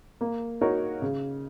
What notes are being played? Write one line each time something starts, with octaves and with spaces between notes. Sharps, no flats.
A#3
D#4 F#4 A#4 C#5
C#3